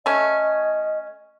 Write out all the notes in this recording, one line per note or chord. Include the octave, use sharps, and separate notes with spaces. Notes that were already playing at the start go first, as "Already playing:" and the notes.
A3 C#4 D#5